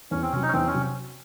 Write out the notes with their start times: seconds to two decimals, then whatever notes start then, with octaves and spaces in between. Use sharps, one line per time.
0.11 E2 C#4
0.22 C4
0.32 C3 F#3 C#4
0.42 D#4
0.48 C#4
0.53 E2 C4
0.67 C#4
0.74 C3 F#3